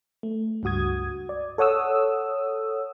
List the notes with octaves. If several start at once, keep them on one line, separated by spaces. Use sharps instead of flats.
A3
C#2 G2 F#4 D#6 G#6
D5
A4 C#5 F#5 D#6 E6